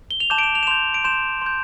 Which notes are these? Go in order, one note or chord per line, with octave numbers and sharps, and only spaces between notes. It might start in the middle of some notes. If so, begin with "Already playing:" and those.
G7
F7
A5 D6 G6 E7
D7
E7
F7
E7
C6 G6 F7
D7
C6 G6 E7
C6 G6